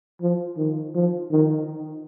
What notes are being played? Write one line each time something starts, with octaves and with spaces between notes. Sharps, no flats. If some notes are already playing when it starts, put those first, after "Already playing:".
F3
D#3
F3
D#3